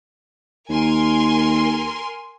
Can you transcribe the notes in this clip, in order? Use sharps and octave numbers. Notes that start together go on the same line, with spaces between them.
D#2 A#4 G#5 C6